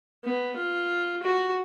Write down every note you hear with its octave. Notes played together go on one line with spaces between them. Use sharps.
B3
F4
F#4